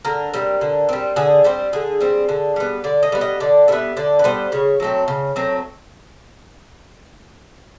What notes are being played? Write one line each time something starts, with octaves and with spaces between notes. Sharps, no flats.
D3 A#4
G3 C4
D3
G3 C4
D3 G#4
G3 C4 G4
D3 G#4
G3 C4
D3
G3 B3
D3 D5
D#5
G3 B3
D#5
D3 D5
G3 B3 E5
D3 D5
B4
G3 B3 C5
C#3 C#5
F#3 A3 C4
C#3
F#3 A3 C4